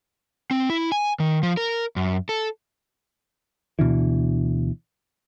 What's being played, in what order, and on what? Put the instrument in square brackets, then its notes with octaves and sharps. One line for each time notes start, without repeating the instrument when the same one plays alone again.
[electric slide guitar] C4
E4
G#5
D#3
F3
A#4
F#2
A4
[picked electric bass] D2 B2 D3 E3